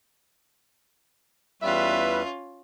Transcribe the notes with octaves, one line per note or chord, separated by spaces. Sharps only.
E2 G3 C#4 F4 B4 E5